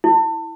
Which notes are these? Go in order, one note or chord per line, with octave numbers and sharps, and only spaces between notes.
E4